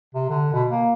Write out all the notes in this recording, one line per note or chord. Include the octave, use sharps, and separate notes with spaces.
C3
D3
B2
A#3